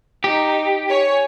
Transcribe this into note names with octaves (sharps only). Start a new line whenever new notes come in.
D#4 G4
C#5 G#5